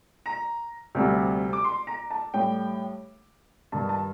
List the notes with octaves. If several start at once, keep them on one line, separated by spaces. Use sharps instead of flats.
A#5
D2 C3 G3
D6
C6
A#5
A5
A2 G3 G5
G2 D#3 G3 A5
A5